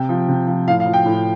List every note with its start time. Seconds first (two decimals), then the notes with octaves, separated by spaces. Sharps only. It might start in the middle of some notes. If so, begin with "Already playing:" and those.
Already playing: C3 G5
0.09 F3
0.29 C3
0.47 F3
0.67 A2 F5
0.80 F5
0.86 F3
0.94 G5
1.06 A2